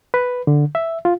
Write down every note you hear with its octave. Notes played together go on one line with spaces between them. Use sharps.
B4
D3
E5
F4